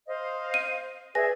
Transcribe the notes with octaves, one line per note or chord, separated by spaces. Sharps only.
C5 D#5 F5
D#7
G#4 B4 D5 E5 G#5 A#6